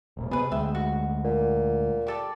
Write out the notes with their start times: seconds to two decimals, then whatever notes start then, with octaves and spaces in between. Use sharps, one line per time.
0.17 E1 C2 A#2
0.31 C3 B3 G#4 B4
0.51 D2 G#3 E5 G5
0.75 F#4
1.25 A#2
2.07 G4 A4 D5